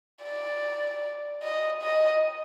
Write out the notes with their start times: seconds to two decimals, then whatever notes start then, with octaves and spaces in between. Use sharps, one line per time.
0.23 D5
1.42 D#5
1.82 D#5